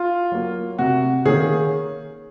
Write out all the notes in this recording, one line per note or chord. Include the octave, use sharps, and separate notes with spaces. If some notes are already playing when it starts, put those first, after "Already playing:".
Already playing: F4
F#3 A#3
C3 F#4
D#3 A#3 C#4 G#4